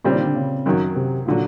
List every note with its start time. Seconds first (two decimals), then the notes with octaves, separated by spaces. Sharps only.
0.05 A#2 C#3 G3 C4
0.15 D#3
0.25 D3
0.35 C#3
0.66 F#2 D#3 F#3
0.96 C3
1.26 A#2 D3 F#3